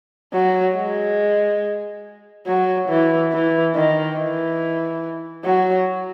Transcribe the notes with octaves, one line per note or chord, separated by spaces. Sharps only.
F#3
G#3
F#3
E3
E3
D#3
E3
F#3